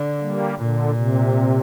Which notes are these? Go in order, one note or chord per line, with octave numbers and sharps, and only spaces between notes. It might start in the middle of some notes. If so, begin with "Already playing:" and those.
Already playing: D3
G3 A#3
A#2 D3
C3